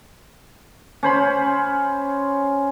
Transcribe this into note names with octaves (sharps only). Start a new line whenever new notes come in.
C#4 C5 B5